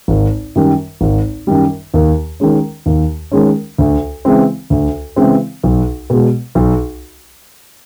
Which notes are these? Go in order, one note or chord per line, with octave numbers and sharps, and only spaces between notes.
G#1
F#2 D#3 G3
G#1
F#2 D#3 G3
D#2
D#3 G#3 C#4
D#2
D#3 G#3 C#4
D2
C#3 E3 G#3 C4
D2
C#3 E3 G#3 C4
B1
B2 G#3
B1